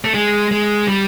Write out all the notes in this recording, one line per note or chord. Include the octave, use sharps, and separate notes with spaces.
A3
G#3
G#3
G3